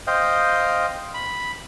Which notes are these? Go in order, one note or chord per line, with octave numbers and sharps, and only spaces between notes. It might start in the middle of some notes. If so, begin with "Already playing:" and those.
C5 D#5 F5 G5
B5